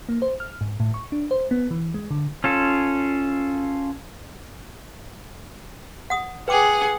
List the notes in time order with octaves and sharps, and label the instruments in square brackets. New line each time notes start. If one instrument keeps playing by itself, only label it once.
[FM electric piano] A#3
C5
F6
G#2
A2
C#6
D4
C5
B3
E3
G#3
D3
[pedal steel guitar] C#4 F4 A4
[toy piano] F#5 D#6
[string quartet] G#4 F#5 [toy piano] B4 G5 D6